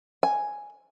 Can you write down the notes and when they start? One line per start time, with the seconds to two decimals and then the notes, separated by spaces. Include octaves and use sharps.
0.23 G#5